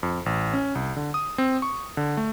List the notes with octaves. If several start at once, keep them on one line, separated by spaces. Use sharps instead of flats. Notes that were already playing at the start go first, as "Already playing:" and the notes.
F2
A1
C#4
C2
D3
D#6
C4
C#6
D3
A3